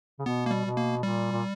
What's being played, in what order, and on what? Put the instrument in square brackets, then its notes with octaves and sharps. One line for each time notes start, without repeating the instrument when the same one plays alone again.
[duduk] C#3
[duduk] B2 [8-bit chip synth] B3
[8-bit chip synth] A#3
G3
[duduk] B2
[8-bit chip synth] A#3
[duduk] A#2 [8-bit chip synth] G3
[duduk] A#2